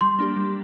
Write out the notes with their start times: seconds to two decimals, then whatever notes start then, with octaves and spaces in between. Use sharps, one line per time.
0.01 G3 C6
0.19 A#3 D4 G4
0.36 G3